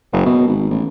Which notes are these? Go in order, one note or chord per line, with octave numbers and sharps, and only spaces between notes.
F#1
B2
G#1
A1